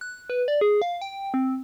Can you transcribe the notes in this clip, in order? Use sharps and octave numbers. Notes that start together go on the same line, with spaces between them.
F#6
B4
D5
G#4
F5
G5
C4